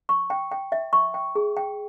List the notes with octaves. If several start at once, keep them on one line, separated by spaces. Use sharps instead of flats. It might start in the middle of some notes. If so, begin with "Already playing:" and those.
C#6
G5
G5
E5
C#6
G5
G#4
G5